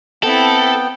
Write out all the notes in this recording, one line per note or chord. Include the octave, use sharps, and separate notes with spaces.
B3 C4 E4 A4 G5